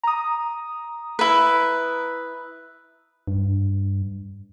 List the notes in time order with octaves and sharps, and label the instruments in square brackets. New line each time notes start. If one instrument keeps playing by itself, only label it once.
[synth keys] A#5 D#6
[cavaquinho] E4 B4
[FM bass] G2